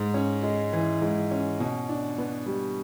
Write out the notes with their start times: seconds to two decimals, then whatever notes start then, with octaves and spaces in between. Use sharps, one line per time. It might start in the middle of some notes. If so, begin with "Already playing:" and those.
Already playing: G#2
0.14 C#4
0.43 G#3
0.73 E3
1.02 G#2
1.31 C#4
1.60 B2
1.89 D4
2.18 B3
2.46 G3